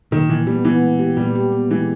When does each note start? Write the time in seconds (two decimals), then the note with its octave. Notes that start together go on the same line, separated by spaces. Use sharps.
0.11 A#2 D#3
0.29 A#2 E3
0.47 G3 B3
0.64 E3 B3
0.82 G#3
0.99 G4
1.17 A#2 G3
1.35 G4
1.52 B3
1.71 E3 G#3